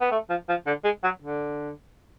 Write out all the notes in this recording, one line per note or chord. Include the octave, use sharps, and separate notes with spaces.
B3
A3
F3
F3
D3
G#3
F#3
D3